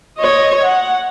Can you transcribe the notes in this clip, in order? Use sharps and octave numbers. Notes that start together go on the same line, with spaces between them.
C#5 D#5
F#5